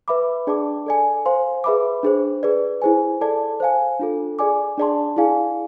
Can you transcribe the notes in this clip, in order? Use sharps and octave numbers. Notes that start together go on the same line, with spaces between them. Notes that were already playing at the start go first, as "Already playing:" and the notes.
B4 E5 B5 D6
D4 G#4 D5 A5 D6
A4 D5 G#5
C5 F5 G#5 C6
G#4 B4 E5 B5 D6
D4 G#4 C5
G#4 B4 D5
E4 G#4 C5 G#5
A4 D5 A5
C5 F5 G#5
D4 F4 A4
G#4 D5 G#5 D6
D4 G#4 D5 A5 C6
E4 G#4 D5 F5 G#5